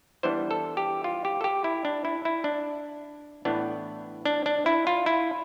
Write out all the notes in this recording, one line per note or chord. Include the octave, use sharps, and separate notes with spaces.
E3 G3 B3 D4 C5
A4
G4
F4
G4
A4
G4
E4
D4
E4
E4
D4
A2 E3 B3 D4
D4
D4
E4
F4
E4